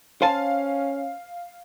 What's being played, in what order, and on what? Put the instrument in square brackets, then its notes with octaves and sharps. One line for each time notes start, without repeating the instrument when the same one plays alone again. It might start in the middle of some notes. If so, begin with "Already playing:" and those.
[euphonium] C#4 [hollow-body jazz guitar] C5 G#5 A5 [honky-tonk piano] F5